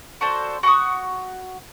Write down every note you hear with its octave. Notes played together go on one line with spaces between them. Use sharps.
F#4 A4 C5 D5
F#4 F#5 C#6 D#6